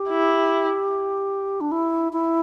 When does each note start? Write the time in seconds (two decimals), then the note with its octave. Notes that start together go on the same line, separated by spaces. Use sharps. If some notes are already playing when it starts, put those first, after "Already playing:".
Already playing: G4
0.09 E4
1.61 D4
1.72 E4
2.13 E4